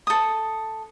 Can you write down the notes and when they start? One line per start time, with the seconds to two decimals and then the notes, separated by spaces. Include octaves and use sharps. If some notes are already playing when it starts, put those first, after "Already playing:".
0.07 A4 D#6